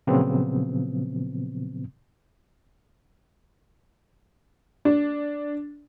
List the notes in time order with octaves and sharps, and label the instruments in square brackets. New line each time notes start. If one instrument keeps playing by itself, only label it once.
[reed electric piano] A#2 C#3 F3 F#3 B3 C4
[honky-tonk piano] D4